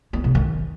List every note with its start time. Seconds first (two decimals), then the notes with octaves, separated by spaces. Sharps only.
0.13 B3
0.24 C3
0.35 D#3